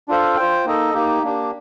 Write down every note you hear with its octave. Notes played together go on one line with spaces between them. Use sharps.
D4 F4 A4 C5 F5
F4 C5 G5
A#3 D#4 A4 D#5
A#3 D#4 G4
A#3 D4 G4